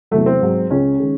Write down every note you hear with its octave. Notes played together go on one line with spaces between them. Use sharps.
E2 C3 F#3 A3
C4
G#2 F#3
C#2 C#3 G#3 C#4
D#3 G#3